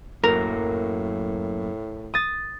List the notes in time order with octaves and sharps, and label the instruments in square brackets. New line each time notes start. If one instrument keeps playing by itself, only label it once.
[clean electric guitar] F#2 F#3 A#3 [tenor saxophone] A2 [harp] A#4
[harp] D#6 A6